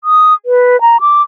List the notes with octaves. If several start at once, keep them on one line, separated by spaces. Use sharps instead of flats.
D#6
B4
A#5
D6